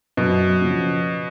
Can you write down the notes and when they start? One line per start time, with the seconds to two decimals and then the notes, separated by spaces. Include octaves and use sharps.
0.17 F#2 B2
0.61 C#3 F3